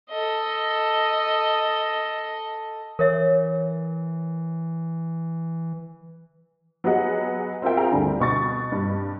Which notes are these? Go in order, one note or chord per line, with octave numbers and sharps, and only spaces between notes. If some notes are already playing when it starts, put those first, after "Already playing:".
A4 D#5
E3 A#4 C#5 E5
F#3 B3 G4 G#4 D#5 F#5
C4 F4 A#4 E5 G5
F4 G#4 G5 G#5 A#5
D2 D3 G3
B2 C#6 A6
G2